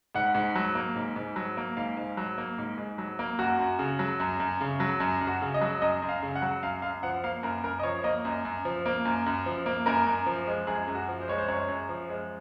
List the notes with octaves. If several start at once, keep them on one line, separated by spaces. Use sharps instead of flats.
G#2 F#5
G#2
F#3
A#3
G#2
G#2
F#3
A#3
G#2 F5
G#2
F#3
A#3
G#2
G#2
F#3
A#3
F#2 F#4
F#2
C#3
F#3
F#2
F#2
C#3
F#3
F#2
F#2
F#4
C#3
D#5
F#3
F#2 D#5
F#2
F5
C#3
F#5
F#3
F#2 F5
F#2 F5
F3 F#5
A#3 F5
F#2 A#4
F#2 A#4
D#5
F3 C#5
A#3 D#5
F#2
F#2
F3
A#3
F#2
F#2
F3
A#3
F#2 A#4
F#2
F3
G#3
F#2 G#4
F#2
F#4
F3
C5
G#3 C#5
C5
F#2 C#5
F#2
F3
G#3